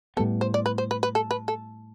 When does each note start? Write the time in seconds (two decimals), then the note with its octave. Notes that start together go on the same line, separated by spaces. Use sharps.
0.17 A2 G3 B3 A4
0.41 C5
0.54 D5
0.66 B4
0.78 C5
0.91 B4
1.03 B4
1.15 A4
1.31 B4
1.48 A4